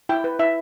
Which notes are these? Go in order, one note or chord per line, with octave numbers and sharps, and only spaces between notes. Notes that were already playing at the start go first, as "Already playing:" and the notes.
E4 G5
B4
E4 E5